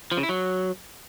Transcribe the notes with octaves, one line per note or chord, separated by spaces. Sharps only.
F3
C#3
E4
F#3